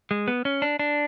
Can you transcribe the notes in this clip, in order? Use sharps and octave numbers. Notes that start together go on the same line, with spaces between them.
G#3
B3
C#4
D4
D4